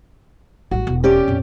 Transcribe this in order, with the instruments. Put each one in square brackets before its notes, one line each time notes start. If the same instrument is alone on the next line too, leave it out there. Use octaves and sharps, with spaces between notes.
[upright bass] A1 G3 [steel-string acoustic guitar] F#4
[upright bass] E1
[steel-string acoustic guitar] C#4 G4 D5
[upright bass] F2 A#2